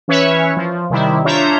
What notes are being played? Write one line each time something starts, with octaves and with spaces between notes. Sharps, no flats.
E3 C#4 B4 C#5 E5
F3
C3 D#3 G3 E4
D4 F4 C#5 E5 A#5 G6